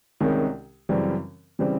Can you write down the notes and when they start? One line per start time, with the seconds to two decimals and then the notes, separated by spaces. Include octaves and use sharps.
0.20 C2 C3 D#3 G#3 C#4
0.89 F#2 C#3 E3 G3 C4
1.59 C#3 E3 G3 C4